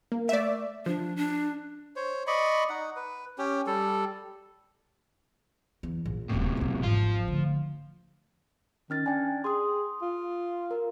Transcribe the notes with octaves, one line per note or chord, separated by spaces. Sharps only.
A#3
A3 D5 E5
F3 D4
D4
C5 C#5
D5 D#5 B5 C#6
D#4 F#5
B4
C#4 G4
G3 A4
E2
A#1
D#1 F#2 A2 C3
B1 E2
G#1 F3 F4
D3 A3
D#3 C#4 F6 A6
D4 G5 G#5
G#4 C6 D#6
F4
A#4